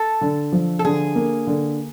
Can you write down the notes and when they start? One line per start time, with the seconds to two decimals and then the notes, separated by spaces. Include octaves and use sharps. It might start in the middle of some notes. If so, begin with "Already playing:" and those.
Already playing: A4
0.21 D3
0.52 F3
0.79 A4
0.84 D3 G#4
1.16 A#3
1.47 D3